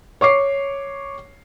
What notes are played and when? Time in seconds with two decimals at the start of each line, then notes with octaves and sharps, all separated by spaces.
0.21 C#5 C#6 D6 C7